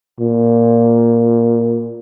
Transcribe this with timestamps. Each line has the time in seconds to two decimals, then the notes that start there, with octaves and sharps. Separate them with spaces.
0.20 A#2